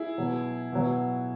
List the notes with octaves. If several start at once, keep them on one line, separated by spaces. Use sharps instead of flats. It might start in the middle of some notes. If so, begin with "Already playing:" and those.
Already playing: E4 G#4
B2 F#3
B2 F#3